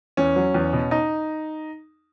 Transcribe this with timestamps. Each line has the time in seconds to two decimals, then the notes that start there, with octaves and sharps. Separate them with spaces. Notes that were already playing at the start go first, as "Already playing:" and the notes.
0.17 E2 C#4
0.36 F#3
0.54 E2
0.73 B2
0.91 D#4